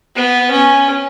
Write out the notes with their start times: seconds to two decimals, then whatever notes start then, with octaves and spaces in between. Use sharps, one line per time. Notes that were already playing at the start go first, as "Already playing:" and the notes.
0.16 B3
0.52 C#4